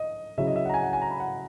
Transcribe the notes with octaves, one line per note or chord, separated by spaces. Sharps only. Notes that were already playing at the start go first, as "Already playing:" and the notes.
Already playing: D#5
C#3 F#3 C#4 E4 E5
D#5
E5
F#5
A#5
G#5
F#5
G#5
A#5
B5
F#5